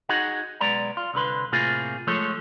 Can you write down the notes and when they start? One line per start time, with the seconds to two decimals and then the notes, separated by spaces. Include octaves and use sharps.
0.09 D#4 F#4 G#4 D#5 F#5
0.61 B1 G#3 B3 D5 A#5
0.97 F4
1.14 C2 D3 B4 C6
1.52 A2 C3 A#3 C4 F4 G#4
2.07 F3 G#3 A3 A4 C#5